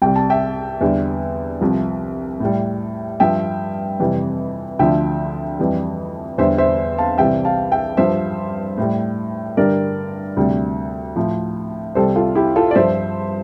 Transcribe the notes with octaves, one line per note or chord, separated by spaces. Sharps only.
C2 C3 G3 G5
A5
E5 G5
E2 D3 G3
C2 C3 F3
A2 G3
G2 F3 E5 G5
F2 C3 E3 G3
D2 D3 F3 E5 G5
F2 E3 G3
E2 D3 G3 C5 E5
C5 E5
F5 A5
C2 C3 E3 G3 E5 G5
F5 A5
E5 G5
G2 F3 C5 E5
A2 G3
G2 D3 G3 A#4 D5
D2 C3 G3
A2 F3
C2 C3 G3 A4 C5
F4 A4
E4 G4
F4 A4
D5
G2 F3 C5 E5